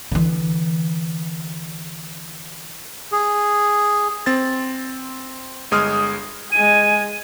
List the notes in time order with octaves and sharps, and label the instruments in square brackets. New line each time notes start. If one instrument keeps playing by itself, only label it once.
[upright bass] D3 E3
[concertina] G#4
[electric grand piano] C4 A6
G1 G#3 D#6 F6
[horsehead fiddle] G#3 G#5 [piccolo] D#7